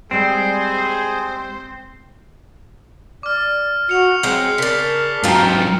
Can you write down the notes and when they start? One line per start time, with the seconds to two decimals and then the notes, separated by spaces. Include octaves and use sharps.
0.11 G3 G#3 C4 G#4 C5
3.23 D5 D6 F6
3.89 F#4 C#7 F7
4.23 F#3 G#3 C4 G6 C7
4.58 C#3 D4 A#4 B6 G7
5.24 G#2 F#3 D#4 F4 B4 G5